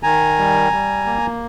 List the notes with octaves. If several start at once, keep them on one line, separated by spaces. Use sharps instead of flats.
D#3 G#5 A#5
G3
G3
A#3